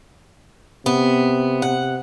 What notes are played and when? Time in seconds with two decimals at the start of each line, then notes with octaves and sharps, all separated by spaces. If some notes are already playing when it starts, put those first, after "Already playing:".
0.86 C3 B3
1.62 F#5